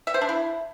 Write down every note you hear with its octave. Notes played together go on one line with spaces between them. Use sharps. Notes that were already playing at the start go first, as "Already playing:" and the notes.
E5
C5
D4
E4